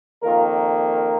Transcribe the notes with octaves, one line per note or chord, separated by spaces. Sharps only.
F2 D#3 A#3 F4 A#4